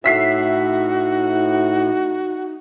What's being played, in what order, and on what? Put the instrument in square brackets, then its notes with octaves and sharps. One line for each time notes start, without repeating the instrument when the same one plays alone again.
[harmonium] A2 [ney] D#4 [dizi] F#4 [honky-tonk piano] E5 B6 C7